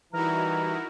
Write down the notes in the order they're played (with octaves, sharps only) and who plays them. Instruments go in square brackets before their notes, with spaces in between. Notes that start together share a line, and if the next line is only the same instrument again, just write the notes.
[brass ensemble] E3 G3 [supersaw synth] D#4 E4 F#4 [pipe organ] A#4 [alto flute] A#5